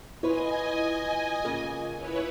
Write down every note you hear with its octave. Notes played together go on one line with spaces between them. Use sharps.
E4 F4 B4 C#5 D#5 G#5
G#2 C#3 A#3 F4
E4 B4 C#5